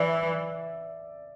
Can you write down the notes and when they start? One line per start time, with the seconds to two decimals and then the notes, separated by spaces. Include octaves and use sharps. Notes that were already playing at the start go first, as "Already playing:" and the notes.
Already playing: E3 D5 E5